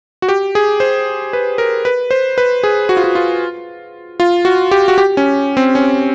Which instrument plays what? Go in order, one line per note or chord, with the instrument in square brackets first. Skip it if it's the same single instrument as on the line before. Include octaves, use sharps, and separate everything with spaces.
[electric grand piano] F#4
G4
G#4
C5
B4
A#4
B4
C5
B4
G#4
F#4
F4
F#4
F4
F4
F#4
G4
F#4
G4
C#4
C4
C#4